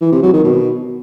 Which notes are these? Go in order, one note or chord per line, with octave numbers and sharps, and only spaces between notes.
E3
C3
F#3
D#3
B2